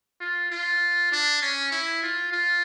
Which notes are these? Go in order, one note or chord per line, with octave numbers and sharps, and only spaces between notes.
F4
F4
D4
C#4
E4
F4
F4